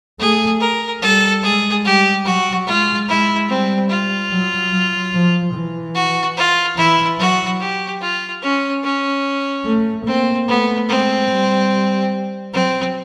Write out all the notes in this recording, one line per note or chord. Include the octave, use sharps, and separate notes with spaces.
A3 G#4
A#4
G3 A4
G#3 G#4
G3 G4
F#3 F#4
G#3 F4
G#3 E4
G3 C4
F4
F#3
F#3
F3
E3
F#4
F4
E3 E4
F#3 F#4
G4
F4
C#4
C#4
A3
A#3 C4
A3 B3
G#3 C4
G3
F#3 C4